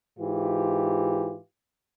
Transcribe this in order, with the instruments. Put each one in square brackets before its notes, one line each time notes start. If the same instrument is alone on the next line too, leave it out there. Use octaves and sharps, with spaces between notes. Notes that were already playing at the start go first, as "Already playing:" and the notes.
[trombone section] G#2 E3 F4 G4